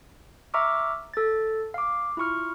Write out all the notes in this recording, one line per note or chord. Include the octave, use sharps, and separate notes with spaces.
E5 A#5 C#6 D6 E6 F6
A4 A6
F5 D6
E4 F4 C#6 F6